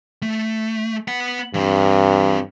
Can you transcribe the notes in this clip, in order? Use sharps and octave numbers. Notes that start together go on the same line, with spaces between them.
A3
B3 F#5
G2 E3 C4